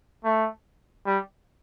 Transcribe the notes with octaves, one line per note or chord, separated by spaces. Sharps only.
A3
G3